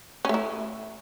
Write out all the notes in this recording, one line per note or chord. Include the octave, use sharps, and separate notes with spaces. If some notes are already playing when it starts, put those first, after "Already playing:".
A3 C#4 E4